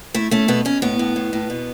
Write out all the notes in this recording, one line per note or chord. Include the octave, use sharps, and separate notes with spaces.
A3 E4
A3 C#4
B2 B3
B2 C#4
A2 B3
A2
A2
A2
B2